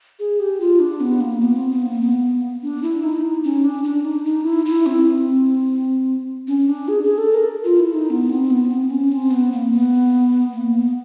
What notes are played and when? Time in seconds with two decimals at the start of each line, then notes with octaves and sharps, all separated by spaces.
0.19 G#4
0.40 G4
0.60 F4
0.80 D4
1.01 B3
1.21 A#3
1.41 B3
1.56 C4
1.71 B3
1.86 A#3
2.02 B3
2.62 D4
2.83 E4
3.03 D#4
3.44 C#4
3.64 D4
3.84 D4
4.05 D#4
4.25 D#4
4.44 E4
4.65 E4
4.86 C4
6.48 C#4
6.68 D4
6.88 G#4
7.04 G#4
7.18 A4
7.34 A#4
7.64 F4
7.79 E4
7.94 D#4
8.10 B3
8.30 C4
8.51 B3
8.71 C4
8.91 C#4
9.12 C4
9.31 B3
9.52 A#3
9.72 B3
10.53 A#3
10.74 B3